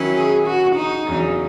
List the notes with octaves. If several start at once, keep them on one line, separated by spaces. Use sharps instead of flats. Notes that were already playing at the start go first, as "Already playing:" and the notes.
Already playing: D#3 F#3 C#4 E4
G#4
F#4
D#4
E2 C#3 F#3